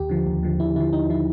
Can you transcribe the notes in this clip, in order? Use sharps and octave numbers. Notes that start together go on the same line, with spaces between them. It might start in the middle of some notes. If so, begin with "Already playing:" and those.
Already playing: D#2 G4
D3 F3
D#2
D3 F3
D#2 E4
D3 F3 E4
D#2 D#4
D3 F3 E4